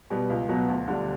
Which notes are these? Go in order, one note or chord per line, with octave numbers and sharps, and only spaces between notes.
B2 G3 B3
C#2
B2 F#3 B3
D2
D3 G3 D4